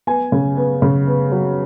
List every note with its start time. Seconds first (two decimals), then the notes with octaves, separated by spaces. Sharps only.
0.07 B3 G#5
0.32 C#3
0.57 B3
0.82 C#3
1.07 B3
1.32 F#3